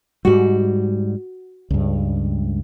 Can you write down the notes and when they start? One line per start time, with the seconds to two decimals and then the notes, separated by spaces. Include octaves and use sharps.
0.25 G#2 G3 F#4
1.70 C#2 G2